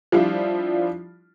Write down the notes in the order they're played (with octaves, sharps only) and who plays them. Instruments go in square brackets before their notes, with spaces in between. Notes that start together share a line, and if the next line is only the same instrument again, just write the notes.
[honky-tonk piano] F3 G3 D4 E4 F4